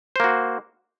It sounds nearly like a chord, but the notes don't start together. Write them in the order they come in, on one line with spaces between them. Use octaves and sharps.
C5 A#3 F#4